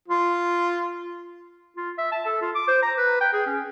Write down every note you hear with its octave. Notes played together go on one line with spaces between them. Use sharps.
F4
F4
E5
A5
A4
F4
D6
C5
A#5
B4
G5
G#4
C#4